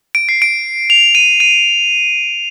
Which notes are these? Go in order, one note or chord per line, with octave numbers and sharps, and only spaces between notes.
D7
C7
D7
F7
D#7
D#7